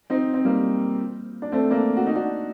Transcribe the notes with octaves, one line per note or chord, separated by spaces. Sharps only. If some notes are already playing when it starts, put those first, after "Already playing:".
C4 D#4
C4
G3 A#3
D4
A3 C4
A#3 D4
F#4
D#4
D4 F#4